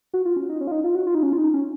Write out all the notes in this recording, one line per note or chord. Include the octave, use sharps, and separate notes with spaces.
F#4
F4
C#4
D#4
C#4
F4
D#4
F4
F#4
F4
D#4
C#4
F4
D#4
C#4